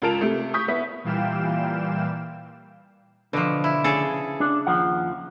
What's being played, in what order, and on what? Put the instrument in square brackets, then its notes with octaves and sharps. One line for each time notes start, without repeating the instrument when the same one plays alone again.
[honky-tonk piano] C#2 F4 A#4 A5 D7 F7
C3 A3
C#6 D#6 G6 B6
B3 E4 B6
[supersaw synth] A#2 E3 G3 F5 G5 E7
[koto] B2 F3 [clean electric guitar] D3
[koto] E4
C#3 G#4 A4
[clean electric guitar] D4
D#2 F3 F#5